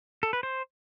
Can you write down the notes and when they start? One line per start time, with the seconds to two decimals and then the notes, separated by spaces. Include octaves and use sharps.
0.23 A4
0.33 B4
0.43 C5